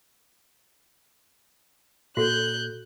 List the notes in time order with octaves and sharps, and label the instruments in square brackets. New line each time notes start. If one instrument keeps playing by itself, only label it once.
[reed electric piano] A#2 [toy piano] F#4 A4 [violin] F#6 G6